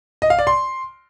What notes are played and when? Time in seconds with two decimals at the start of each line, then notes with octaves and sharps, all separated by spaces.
0.22 D#5
0.30 F5
0.39 D5
0.47 C6